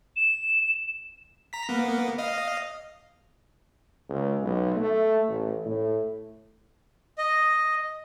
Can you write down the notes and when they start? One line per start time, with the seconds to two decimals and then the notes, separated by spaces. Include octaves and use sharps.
0.16 E7
1.53 A#5 B6
1.69 A#3 B3
2.18 D#5 F5
4.09 C#2
4.43 B1
4.76 A3
5.28 A1
5.65 A2
7.18 D#5